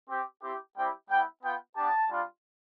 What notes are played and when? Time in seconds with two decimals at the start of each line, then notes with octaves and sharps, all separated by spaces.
0.10 C4 G4
0.43 C4 E4 G4
0.76 G3 C4 E4 G4 G5
1.10 G3 B3 E4 G5
1.43 B3 F4 G5
1.77 B3 D4 G4 A5
2.10 G3 D4 F4